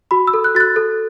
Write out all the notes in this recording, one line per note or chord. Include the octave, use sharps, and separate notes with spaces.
F#4 B5
E6
A4
F#6
F#4 A6
F#6
A4